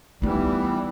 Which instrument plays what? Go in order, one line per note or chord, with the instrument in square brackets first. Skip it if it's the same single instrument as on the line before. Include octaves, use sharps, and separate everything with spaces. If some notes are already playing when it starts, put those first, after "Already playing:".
[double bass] E3 B3 [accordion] G3 [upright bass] A3 F4 [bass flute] D#4